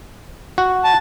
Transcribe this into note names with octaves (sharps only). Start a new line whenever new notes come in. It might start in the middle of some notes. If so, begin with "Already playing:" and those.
F#4
A5